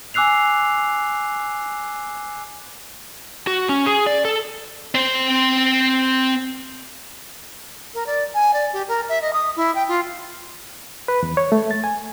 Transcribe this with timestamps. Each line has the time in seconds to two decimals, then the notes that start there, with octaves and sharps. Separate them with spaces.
0.14 G#5 D6 E6 F#6 C7 F7
3.47 F#4
3.69 C#4
3.86 G#4
4.07 D5
4.25 A4
4.95 C4 C5
7.94 A#4
8.06 D5
8.34 G#5
8.54 D5
8.73 G4
8.88 A#4
9.09 E5
9.22 D#5
9.33 D#6
9.56 E4
9.75 G5
9.88 F4
11.08 B4
11.23 E2
11.37 C#5
11.52 A3
11.71 A6
11.84 G#5